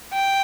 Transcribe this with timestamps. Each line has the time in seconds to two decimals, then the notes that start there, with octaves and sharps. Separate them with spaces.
0.13 G5